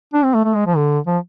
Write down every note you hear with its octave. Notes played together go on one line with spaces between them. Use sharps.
D4
C4
A3
A3
G#3
F3
D3
F3